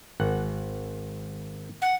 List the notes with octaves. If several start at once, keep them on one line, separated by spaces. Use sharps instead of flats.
G#1 F#5
F#5